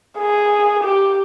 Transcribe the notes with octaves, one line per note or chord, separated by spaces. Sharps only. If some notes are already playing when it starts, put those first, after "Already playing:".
G#4
G4